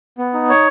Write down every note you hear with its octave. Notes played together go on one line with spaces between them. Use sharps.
B3
D#4
C#5